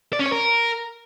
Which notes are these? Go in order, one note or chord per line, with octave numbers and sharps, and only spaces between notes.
D5
C#4
C#5
A#4